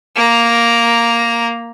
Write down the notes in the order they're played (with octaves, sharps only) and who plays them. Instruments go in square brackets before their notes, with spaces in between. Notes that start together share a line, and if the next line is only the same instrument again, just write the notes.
[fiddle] A#3 A#5